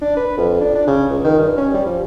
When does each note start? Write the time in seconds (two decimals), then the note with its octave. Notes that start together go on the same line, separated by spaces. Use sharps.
0.01 D4
0.17 B4
0.37 F2
0.60 D4
0.75 D4
0.87 C#3
1.10 C#2
1.24 D#3
1.39 G2
1.57 C#4
1.74 G3
1.86 F3